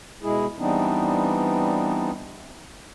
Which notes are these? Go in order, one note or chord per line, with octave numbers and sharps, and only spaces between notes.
B2 G#3 E4 G#4
E3 G3 B3 C4 D4 D#4